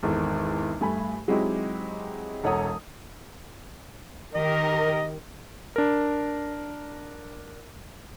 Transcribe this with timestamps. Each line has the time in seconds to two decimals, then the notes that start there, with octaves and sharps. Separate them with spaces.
0.03 G#1 E2 A4
0.81 G2 A3 G#5 B5
1.28 F#3 G#3 C4 D#4 E4 G4
2.44 E1 A4 C#5 F#5 A#5 D#6
4.35 D#3 G4 A#4 D#5
5.76 D4 A#4